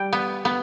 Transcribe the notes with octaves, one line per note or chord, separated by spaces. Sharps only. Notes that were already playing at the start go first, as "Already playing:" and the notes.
Already playing: G3 G5
B3
B3